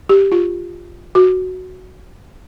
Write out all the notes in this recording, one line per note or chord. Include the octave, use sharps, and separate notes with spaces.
G4
F4
F#4